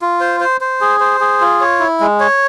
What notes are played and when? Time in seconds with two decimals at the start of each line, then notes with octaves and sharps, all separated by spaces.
0.02 F4
0.21 C5
0.40 C5
0.61 C5
0.81 G#4
1.00 C5
1.20 G#4
1.41 F4
1.61 C#5
1.80 E4
2.00 G#3
2.20 C#5